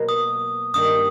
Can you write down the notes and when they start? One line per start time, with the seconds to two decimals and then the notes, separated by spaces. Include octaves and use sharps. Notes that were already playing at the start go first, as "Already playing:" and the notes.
Already playing: B2 F#3 A#3
0.09 D#6
0.74 G2 D#3 G3 A#3 D#6